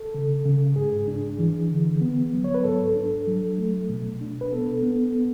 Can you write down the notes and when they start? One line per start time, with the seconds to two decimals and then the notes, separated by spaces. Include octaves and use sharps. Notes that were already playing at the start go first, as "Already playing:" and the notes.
Already playing: A4
0.14 C#3
0.45 C#3
0.76 G#2 G#4
1.08 D4
1.39 E3
1.70 D3
2.01 B3
2.33 F#3
2.44 C#5
2.54 B4
2.64 G#2 A4
2.96 D4
3.27 F#3
3.58 A3
3.89 B2
4.21 D4
4.41 B4
4.52 B3 A4
4.83 B3
5.15 B3